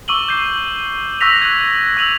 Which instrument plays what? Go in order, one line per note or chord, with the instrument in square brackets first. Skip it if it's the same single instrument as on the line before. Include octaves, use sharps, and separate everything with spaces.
[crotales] C#6 D6 E6 D#7 F#7 G7
G6 C7
C#6 E6 F#6 A#6 B6 F7
F#6 G#6
E6 D#7 F7 F#7